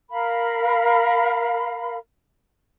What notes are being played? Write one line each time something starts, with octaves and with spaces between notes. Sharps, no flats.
A#4 F5 B5